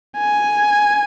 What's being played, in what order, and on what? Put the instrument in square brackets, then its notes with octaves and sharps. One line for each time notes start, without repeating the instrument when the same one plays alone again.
[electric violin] G#5